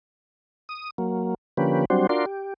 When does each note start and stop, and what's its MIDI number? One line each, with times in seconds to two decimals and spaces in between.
0.69 0.90 87
0.98 1.34 54
0.98 1.34 58
1.57 1.85 50
1.57 1.85 53
1.57 1.85 58
1.57 1.85 61
1.57 1.85 67
1.57 1.85 71
1.90 2.07 54
1.90 2.07 55
1.90 2.07 60
1.90 2.07 62
1.90 2.07 66
1.90 2.07 72
2.09 2.25 62
2.09 2.25 65
2.09 2.25 66
2.09 2.25 70
2.09 2.25 74
2.09 2.25 84
2.26 2.54 67